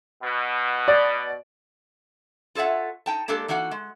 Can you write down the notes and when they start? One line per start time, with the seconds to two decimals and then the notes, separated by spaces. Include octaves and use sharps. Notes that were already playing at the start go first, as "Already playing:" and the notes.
0.22 B2
0.88 D5
2.55 F4 A4 C#5 E5 F#5
3.06 D#4 G5 A5
3.28 G#3 A#3 D4 G4 A4
3.48 E3 A#3 D#4 F#4 F#5
3.71 G#3